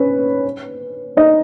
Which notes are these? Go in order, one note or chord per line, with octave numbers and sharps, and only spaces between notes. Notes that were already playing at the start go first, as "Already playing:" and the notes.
Already playing: C#4 B4 C#5
D#4 D#5